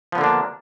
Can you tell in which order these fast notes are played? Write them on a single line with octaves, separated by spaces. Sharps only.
F3 B3 D3 A#3 D4